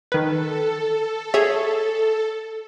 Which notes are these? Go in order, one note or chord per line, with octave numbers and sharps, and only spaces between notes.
D#3 A4 B4
G#4 C#5 E5